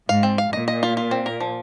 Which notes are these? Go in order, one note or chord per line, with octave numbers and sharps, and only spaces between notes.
G#2 F5
C4
F5
A#2 D#5
D#5
F4
F4
C4
A#4
F3